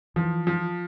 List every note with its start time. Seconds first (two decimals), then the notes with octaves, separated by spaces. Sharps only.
0.16 E3 F3
0.47 F3